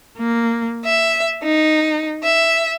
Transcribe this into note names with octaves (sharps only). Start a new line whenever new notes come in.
A#3
E5
D#4
E5